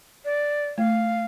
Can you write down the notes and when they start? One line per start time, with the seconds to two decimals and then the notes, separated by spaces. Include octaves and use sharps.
0.25 D5
0.78 A3 F5